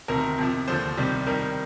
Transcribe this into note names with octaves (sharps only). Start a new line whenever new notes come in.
D2 C3 D#3 A#4
F2 C3 F3
D#2 D3 F3 C5
C2 C3 D#3 G3
F2 D#3 G3 A#4